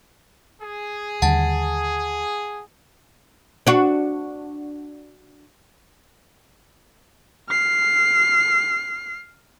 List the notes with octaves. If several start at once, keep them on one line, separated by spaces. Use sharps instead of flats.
G#4
D#2 D3 G3 F#5 A5 A6
D4 F#4
F6 C7